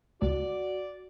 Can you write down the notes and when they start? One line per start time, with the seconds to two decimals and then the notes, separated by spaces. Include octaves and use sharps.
0.22 C#2 F#4 D5